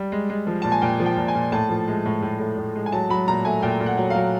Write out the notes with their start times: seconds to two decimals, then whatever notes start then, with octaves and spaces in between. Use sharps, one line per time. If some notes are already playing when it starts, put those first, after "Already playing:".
Already playing: G3
0.12 G#3
0.30 G#3
0.47 F3
0.62 A#2 A5
0.72 G#5
0.82 A#2 G5
1.00 F3
1.06 G5
1.17 A#2
1.28 G#5
1.35 A#2
1.52 A2 A5
1.69 F3
1.88 G#3
2.06 A2
2.22 A2
2.40 A2
2.58 A2
2.76 G#3
2.86 G#5
2.92 F#3 A5
3.10 F#3 B5
3.28 A#2 A#5
3.45 A3 G#5
3.62 A#2 G5
3.80 A#2
3.86 F#5
3.97 F#3
4.10 F#3 F5